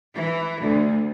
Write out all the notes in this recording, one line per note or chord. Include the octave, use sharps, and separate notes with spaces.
E3
D2